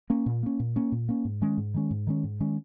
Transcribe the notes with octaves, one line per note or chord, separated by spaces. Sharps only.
A#3 C#4
A#2
A#3 C#4
A#2
A#3 C#4
A#2
A#3 C#4
G#2
D#3 G#3 C#4
G#2
D#3 G#3 C#4
G#2
D#3 G#3 C#4
G#2
D#3 G#3 C#4